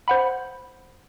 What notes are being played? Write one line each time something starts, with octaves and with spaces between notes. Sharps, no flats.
C5 F#5 B5